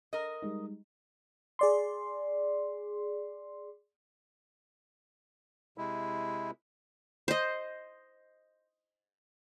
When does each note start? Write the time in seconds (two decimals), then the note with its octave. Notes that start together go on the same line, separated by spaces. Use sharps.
0.13 A#4 D#5
0.42 G3 G#3 D#4
1.59 G#4 D5 C6
5.78 C3 G#3 E4
7.28 C5 D#5